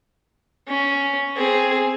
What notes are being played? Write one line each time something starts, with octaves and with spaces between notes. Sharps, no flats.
C#4
C4 G#4